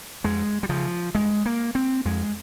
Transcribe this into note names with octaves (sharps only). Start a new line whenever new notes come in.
F2 G#3
G3
C#3 F3
G2 G#3
A#3
C4
F2 G#3